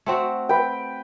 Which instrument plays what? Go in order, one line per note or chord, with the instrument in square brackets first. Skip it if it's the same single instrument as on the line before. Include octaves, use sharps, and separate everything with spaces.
[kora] A3 C4 F#4
[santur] B4 G5